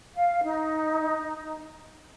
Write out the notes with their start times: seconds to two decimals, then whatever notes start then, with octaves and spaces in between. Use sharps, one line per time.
0.14 F5
0.42 D#4